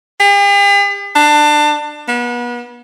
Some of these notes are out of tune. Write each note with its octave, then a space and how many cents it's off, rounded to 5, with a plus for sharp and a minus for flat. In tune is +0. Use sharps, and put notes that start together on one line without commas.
G4 +45
D4 +20
B3 -35